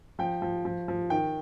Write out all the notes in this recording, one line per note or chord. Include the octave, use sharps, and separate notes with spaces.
F3 G5
F3
F3
F3
D#3 G5